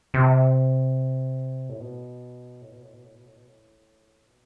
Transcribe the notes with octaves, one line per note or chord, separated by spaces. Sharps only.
C3
A2
B2
A2
B2
A2
B2
A2
B2
A2
B2
A2
B2